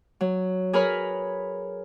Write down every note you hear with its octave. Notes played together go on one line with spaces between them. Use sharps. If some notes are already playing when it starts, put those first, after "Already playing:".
F#3
G#4 A#4 B4 C#5 B5 F6